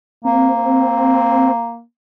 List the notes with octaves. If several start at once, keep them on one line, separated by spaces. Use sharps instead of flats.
A#3 C4